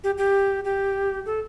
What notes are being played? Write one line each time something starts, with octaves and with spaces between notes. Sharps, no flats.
G4
G4
G4
A4